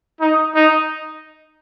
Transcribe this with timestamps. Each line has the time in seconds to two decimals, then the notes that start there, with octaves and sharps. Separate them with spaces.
0.21 D#4
0.55 D#4